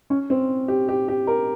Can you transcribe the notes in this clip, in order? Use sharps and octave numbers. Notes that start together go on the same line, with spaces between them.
C#4
C4
G4
G4
G4
A#4